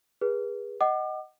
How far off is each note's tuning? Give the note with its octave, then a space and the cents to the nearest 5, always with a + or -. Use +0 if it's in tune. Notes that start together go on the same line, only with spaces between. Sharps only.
G#4 -30 B4 -30
D#5 +0 F#5 +25 D6 +35